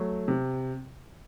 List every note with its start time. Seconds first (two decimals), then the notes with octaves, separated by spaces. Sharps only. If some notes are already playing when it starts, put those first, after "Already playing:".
Already playing: F#3 A3
0.28 C3